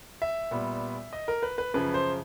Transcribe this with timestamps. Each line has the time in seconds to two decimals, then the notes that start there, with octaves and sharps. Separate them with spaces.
0.22 E5
0.51 A#2 G3 B3
1.13 D#5
1.28 A#4
1.43 B4
1.58 B4
1.74 F#2 C#3 F3 B4
1.94 C5